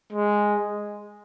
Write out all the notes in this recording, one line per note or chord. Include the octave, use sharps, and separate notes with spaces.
G#3